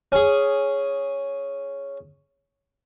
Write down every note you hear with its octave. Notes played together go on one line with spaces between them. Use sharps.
C#4 G#4